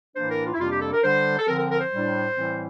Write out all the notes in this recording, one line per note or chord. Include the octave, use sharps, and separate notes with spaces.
A2 E3 A#3 D4 C5
A#4
F4
E4
F2 C3 G3 A#3 D4 F4
G4
A4
A#4
D3 G3 D4 C5
A4
D3 F3 C4 A#4
A#4
A#4
C5
A2 G3 D4
A2 E3 G3 C4